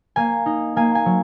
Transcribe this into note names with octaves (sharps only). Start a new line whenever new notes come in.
A#3 G#5
D#4
A#3 G#5
G#5
F#3